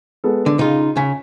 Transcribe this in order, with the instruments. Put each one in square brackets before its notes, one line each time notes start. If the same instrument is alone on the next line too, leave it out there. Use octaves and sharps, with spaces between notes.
[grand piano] G#3 B3 A4
[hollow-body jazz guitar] D3
[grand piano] C#3 [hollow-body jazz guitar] D#4 F4
[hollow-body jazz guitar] C#3 [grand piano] G#5 B6